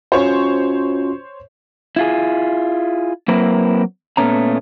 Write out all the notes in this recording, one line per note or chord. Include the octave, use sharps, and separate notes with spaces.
C#4 F4 F#4 C5 C#5 C#6
E4 F4 G#4
F#3 A#3 C4 E4 A#4 B4
A#2 A3 B3 C#4 A#5